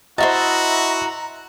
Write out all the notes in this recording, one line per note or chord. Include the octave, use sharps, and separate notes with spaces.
E4 F#4 C5 D#5 E5 A5 A#5